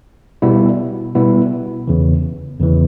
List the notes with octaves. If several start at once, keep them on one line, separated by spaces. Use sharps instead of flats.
B2 G3 B3 E4
B2 G3 B3 E4
E2 C#3 E3
E2 C#3 E3